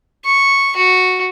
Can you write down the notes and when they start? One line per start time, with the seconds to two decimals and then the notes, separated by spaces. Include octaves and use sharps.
0.25 C#6
0.76 F#4